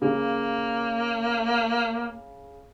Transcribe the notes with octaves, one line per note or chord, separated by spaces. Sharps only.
C#3 A#3